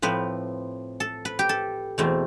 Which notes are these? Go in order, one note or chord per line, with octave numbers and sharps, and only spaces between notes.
A2 F3 C4 B4
A4
B4
G4
A4
E2 B2 A3 C4